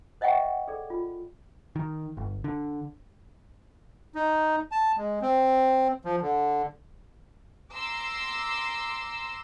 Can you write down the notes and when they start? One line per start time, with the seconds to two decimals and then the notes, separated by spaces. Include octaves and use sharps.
0.21 C5 D#5 E5 F#5 G5 C#6
0.68 G#4 A4 D5
0.90 F4
1.76 D#3
2.17 G1
2.44 D3
4.15 D#4
4.71 A5
4.97 G#3
5.22 C4
6.05 F3
6.22 D3
7.73 A#5 C6 D6 E6